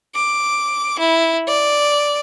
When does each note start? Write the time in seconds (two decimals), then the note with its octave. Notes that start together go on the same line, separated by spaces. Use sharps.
0.15 D6
0.99 E4
1.48 D5